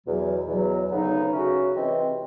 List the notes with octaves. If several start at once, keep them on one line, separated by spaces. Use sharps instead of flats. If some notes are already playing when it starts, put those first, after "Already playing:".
E2 B2 F#3
E2 B2 F#3
D2 C#3 F#3 B3 D#4
C#3 F#3 A3 C#4 F#4
C3 E3 G#3 C4